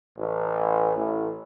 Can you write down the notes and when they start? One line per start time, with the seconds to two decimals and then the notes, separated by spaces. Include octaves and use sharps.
0.18 A1
0.96 A1